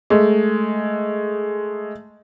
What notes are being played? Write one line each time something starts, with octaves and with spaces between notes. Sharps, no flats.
G#3 A3